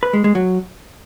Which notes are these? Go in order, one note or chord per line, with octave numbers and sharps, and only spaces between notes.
B4
G#3
G#3
F#3